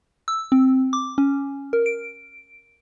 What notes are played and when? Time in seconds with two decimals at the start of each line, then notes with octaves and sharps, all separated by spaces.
0.28 E6
0.52 C4
0.93 D6
1.18 C#4
1.73 A#4
1.86 D7